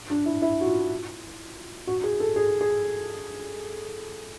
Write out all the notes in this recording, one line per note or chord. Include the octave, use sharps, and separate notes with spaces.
D4
E4
E4
F#4
F4
F#4
G#4
A4
G#4
G#4